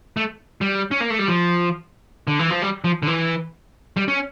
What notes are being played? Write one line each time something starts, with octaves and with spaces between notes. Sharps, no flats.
A3
G3
C#4
A#3
A3
G3
F3
D3
E3
F3
G3
F3
D3
E3
G3
C#4